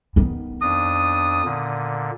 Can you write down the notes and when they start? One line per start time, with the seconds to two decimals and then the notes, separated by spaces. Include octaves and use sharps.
0.16 D#3 B3
0.62 F2 D4 D#6
1.45 A#2 D3